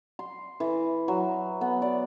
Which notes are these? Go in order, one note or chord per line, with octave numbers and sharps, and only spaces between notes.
C6
E3
F#3
B3
D5